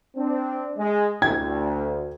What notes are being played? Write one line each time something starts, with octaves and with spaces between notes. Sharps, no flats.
C4 D4
G#3
D2 G5 G#6